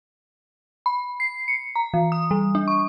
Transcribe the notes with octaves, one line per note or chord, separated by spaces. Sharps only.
B5
C7
C#7
A#5
E3
D#6
G3
D4
C#6